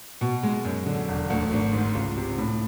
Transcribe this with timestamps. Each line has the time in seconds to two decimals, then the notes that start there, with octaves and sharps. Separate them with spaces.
0.21 B2
0.43 G#3
0.65 F#2
0.86 D3
1.08 E1
1.30 D2
1.52 G#1
1.73 G#2
1.95 C#2
2.17 C3
2.38 A2